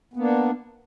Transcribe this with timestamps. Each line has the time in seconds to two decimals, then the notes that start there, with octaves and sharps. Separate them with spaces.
0.14 B3
0.16 A#3
0.19 D4